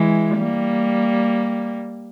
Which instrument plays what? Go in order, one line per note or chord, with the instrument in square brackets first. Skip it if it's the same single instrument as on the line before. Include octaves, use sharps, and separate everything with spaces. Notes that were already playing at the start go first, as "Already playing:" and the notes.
Already playing: [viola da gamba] E3 G#3
G3 A#3